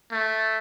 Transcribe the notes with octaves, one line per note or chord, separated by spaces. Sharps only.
A3